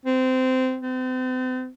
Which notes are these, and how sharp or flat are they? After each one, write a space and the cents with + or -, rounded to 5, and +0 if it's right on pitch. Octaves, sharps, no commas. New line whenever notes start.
C4 -20
C4 -40